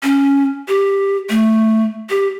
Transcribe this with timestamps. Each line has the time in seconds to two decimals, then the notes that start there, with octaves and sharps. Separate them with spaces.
0.03 C#4
0.68 G4
1.30 A3
2.10 G4